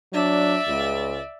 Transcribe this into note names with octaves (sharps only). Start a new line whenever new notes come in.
F#3 D4 D5 E5
C#2